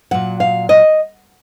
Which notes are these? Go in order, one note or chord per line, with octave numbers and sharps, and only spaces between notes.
A#2 F#3 F#5
F5
D#5